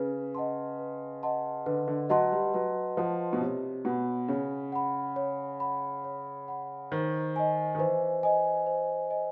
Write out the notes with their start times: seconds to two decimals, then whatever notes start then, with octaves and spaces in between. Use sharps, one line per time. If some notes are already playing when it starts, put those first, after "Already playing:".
Already playing: C#3 B4
0.35 D#5 F#5 A5 C6
0.79 B4
1.23 D#5 F#5 A5 C6
1.66 D3 B4
1.88 D3
2.10 F#3 D#5 F#5 A5 C6
2.32 G3
2.54 F#3 B4
2.97 F3 D#5 F#5 A5 C6
3.33 B2
3.41 C3 C#5
3.85 B2 F#5 B5
4.28 C#3 C#5
4.72 F#5 B5
5.16 C#5
5.60 F#5 B5
6.04 C#5
6.48 F#5 B5
6.92 D#3 C5
7.36 D#5 G#5
7.75 D#3
7.79 E3 C5
8.23 D#5 G#5
8.67 C5
9.10 D#5 G#5